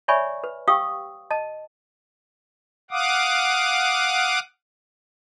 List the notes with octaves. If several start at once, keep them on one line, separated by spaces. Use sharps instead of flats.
C#5 D5 E5 G#5 B5 C#6
B4
G4 F5 G5 C#6 D#6 E6
D#5 A5
F5 F#5 D6 D#6